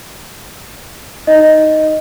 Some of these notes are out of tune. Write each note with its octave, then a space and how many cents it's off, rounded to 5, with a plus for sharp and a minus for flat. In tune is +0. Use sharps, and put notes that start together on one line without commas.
D#4 +0 D#5 +0